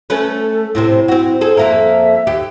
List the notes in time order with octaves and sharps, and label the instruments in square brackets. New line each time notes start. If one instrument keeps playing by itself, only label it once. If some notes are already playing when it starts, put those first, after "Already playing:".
[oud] A3 C#4 B4 [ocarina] A4
[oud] A2 C3 C4 [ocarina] E4
[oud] C4 F#4
[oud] G#4 A4 [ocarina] C5
[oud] F2 A#3 A#4 [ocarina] E5
[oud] D#2 G4